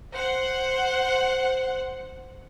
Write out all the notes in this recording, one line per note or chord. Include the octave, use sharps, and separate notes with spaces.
C5 F#5